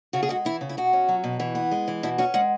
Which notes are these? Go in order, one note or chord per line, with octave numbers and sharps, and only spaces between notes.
C#3 F#4
G#4
G#3 F#4
E3 E4
C#3
E4
B2 F#4
C#4
F#3
B2
E3
B3
G#3
E3
B2 E4
C#4 F#4
G#3 F#5